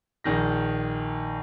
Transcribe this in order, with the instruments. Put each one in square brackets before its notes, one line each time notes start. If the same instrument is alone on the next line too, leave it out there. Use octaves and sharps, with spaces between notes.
[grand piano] A#1 D#3 A#6